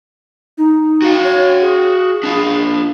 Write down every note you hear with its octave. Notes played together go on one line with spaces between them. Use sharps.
D#4
F#4 F5
C#5
G#4
D4 F4